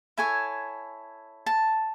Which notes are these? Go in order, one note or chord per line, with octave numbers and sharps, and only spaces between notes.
E4 A4 C#5 G#5
A5